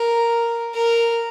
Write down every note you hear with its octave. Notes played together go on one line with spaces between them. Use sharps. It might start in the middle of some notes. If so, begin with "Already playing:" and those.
Already playing: A#4
A#4